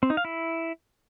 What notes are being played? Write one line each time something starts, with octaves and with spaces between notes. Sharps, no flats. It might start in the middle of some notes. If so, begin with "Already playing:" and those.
C4
D#4
F5
E4